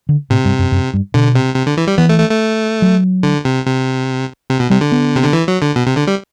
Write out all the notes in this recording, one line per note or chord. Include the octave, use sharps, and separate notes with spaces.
D3
A2 C3
G2
F#2
F#2
G2
B2 D3
C3
C3
D3
E3
G3
E3 B3
A3
A3
A3
F#3
D3
C3
C3
C3
B2
C3 G3
D3
B3
C3
D3
E3
F#3
D3
B2
C3
D3
G3